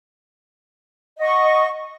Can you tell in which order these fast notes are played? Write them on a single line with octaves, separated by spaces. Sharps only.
D#5 F#5 C#6